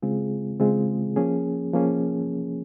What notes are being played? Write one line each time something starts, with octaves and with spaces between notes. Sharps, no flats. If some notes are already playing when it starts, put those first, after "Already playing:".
C#3 G#3 C4 F4 G#4
C#3 G#3 C4 F4 G#4
F3 A#3 C#4 G#4
F3 A#3 C#4 G#4